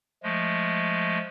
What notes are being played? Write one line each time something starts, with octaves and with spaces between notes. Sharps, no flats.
F3 G#3 A3